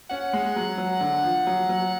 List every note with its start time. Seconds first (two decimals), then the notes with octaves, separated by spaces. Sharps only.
0.10 C#4 F#5
0.33 G#3
0.56 F#3
0.78 F#3
1.01 D3
1.23 F3
1.47 F#3
1.69 F#3